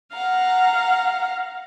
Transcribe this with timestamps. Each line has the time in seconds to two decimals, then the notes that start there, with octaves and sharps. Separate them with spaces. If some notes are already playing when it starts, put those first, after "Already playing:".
0.12 F5 F#5 A#5